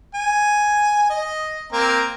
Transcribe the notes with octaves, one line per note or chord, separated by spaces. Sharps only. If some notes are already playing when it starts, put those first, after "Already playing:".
G#5
D#5
A#3 C4 A#5